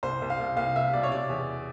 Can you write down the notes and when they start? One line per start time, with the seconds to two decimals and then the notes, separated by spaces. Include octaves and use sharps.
0.03 C2 C5
0.22 C2
0.30 F5
0.40 C2
0.57 C2 F5
0.75 C2 E5
0.93 B2 D5
1.03 C#5
1.11 C3 D5
1.29 E2